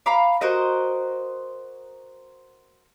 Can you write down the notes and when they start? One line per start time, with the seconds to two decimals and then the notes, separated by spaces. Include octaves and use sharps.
0.06 F5 A#5 B5 D6
0.41 F#4 A#4 C5 D#5